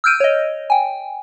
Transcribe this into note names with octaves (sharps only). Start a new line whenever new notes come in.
E6 F6 G6 D7 D#7
C#5 D#5
G5 G#5